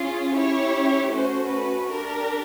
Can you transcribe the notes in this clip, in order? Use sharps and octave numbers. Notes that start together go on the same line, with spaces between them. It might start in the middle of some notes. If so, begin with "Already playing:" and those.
Already playing: C#4 F4 G#4
C#4 E4 G4 C#5
A3 C#4 F#4 C5
B4
D4 G4 A#4